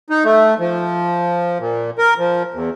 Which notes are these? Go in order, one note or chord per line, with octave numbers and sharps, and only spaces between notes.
D#4
A3
F3
A#2
A#4
F3
E2